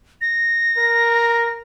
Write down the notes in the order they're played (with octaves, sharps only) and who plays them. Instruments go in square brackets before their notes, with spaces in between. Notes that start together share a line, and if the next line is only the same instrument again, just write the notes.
[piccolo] A#6
[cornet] A#4